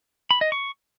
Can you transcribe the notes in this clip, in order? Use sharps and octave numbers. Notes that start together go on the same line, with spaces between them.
B5
D#5
C#6